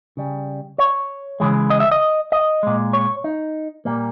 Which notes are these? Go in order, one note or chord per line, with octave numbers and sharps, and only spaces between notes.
C#3 G3
C#5
C#3 E3 G#3
D#5
E5
D#5
D#5
A#2 G#3
C#5
D#4
A#2 G3 A#3